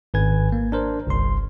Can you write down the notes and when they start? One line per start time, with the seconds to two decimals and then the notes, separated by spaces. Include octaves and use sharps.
0.14 G#1 B4 G#5 G#6
0.52 A#3
0.72 D4 A#4 C5
1.07 G1 C2 C6